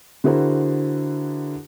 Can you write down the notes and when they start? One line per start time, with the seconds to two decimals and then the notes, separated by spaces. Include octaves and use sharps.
0.24 D3 E4 F#4 G#4 A#4 C5